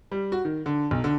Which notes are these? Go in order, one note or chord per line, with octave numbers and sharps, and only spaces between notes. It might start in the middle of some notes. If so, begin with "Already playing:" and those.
G3
F#4
D#3
D3
B1
D3